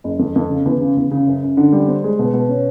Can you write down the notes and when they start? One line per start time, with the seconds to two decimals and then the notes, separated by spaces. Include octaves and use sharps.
0.04 F#1
0.19 F2
0.36 F2
0.50 C#3
0.66 E2
0.81 C#3
0.97 E2
1.11 C#3
1.27 F#2
1.43 F#2
1.57 D3
1.73 G3
1.88 C4
2.04 G#3
2.19 B2
2.34 B2
2.49 C#4